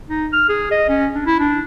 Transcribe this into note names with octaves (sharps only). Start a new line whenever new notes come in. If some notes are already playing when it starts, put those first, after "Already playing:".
D#4
F6
G#4
D#5
C#4
D4
E4
D4